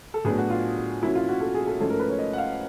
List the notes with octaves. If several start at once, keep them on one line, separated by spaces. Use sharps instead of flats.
A4
A2 F#3 B3 D4 G#4
F#4
F4
B2 F#3 A#3 C#4 E4
F4
F#4
A4
G#4
A4
G#2 F3 A3 C#4 A4
A#4
B4
C#5
D#5
F#5
F5